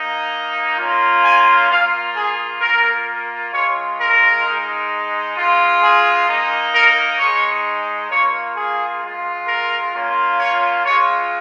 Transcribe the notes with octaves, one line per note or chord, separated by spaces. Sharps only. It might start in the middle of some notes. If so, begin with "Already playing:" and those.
Already playing: A#3 D#4
A#3 C#4 F4
G#5
A#3 F4 F5
G#4
A#3 F4 A#4
G#3 F4 C#5
A#4
G#3 D#4
G#3 F4
G#4
A#3 D#4
A#4
G#3 D#4 C#5
A#3 F4 C#5
G#4
G#3 F4
A#4
A#3 C#4 F4
C#5
G#3 F4 C#5